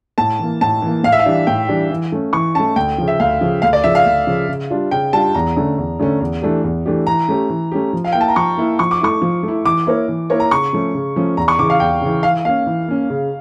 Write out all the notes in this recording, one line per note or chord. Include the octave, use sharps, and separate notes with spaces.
A2 A5
E3 A#3
A2 A5
E3 A#3
A2 F5
E5
F5
E3 G3 D4 G4
A2 G5
E3 G3 D4 G4
E3
A3 C#4
E3 C#6
A3 C#4 A5
D2 G5
C#3 F3
E5
D2 F5
C#3 F3
D2 F5
D5
C#3 F3 E5
F5
D2
C#3 F3
C#3
G3 D4 F4
C#3 G5
G3 D4 F4 A5
E2 A#5
D3 A3 C#4
E2
D3 A3 C#4
E2
E3 A3 D4 G4
E2
E3 A3 D4 G4
E3 A#5
A3 C#4 G4
E3
A3 C#4 G4
F3
F5
A#3 E4 G5
A5
A#5
F3 C#6
A#3 E4
F3 C#6
D6
A3 E4 C#6
F3
A3
E4
E3 D6
A#3 E4 A#4 C#5
E3
A#3 E4 A#4 C#5
A#5
C#3 C#6
F3 A3 C#4
C#3
F3 A3 C#4
E2 A#5
C#6
C#3 E3 D6
F5
E2 G5
C#3 E3
E3 F5
A#3 C#4 F5
E3
A#3 C#4
C#3